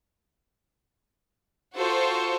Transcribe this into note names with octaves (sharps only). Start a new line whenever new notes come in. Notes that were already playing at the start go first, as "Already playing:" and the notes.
F4 F#4 A4 C5 C#6